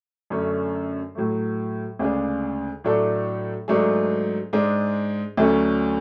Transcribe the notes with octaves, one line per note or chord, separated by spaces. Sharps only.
F#2 D3 A3 C#4
A2 F#3 A3
D2 C#3 G#3 D4 G#4
A2 F#3 A3 D4 A4
G#2 F#3 A3 D4 G#4
G#2 G#3 D4 G#4
D2 D3 F#3 A3 C#4